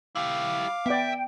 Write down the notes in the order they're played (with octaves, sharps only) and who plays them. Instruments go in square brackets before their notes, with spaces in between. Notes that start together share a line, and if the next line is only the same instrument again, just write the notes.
[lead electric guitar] E4 G4 [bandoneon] F5 D6
[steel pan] B3 D5 [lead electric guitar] E5 [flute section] G5